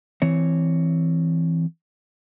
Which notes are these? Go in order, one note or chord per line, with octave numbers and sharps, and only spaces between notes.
E3 C4 C#5